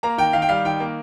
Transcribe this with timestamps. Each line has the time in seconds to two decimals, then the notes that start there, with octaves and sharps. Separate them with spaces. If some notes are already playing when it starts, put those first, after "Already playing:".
0.03 A#3 A#5
0.18 D#3 G5
0.33 D#3 F5
0.42 G5
0.49 G3 F5
0.65 D#3 G5
0.80 A#3